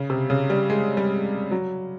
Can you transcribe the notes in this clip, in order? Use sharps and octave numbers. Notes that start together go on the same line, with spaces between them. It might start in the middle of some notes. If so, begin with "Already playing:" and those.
Already playing: C#3
C3
C#3
G3
G#3
G3
F#3